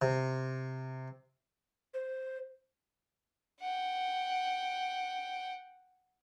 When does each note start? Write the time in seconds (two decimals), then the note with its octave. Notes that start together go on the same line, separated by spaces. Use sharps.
0.02 C3
1.94 C5
3.61 F#5 G5